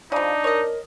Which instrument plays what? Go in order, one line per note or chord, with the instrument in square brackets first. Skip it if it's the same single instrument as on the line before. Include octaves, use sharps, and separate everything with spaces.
[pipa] C#3 F3 [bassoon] D4 [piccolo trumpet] D#4
[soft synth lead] A#4 [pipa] C#5 D#5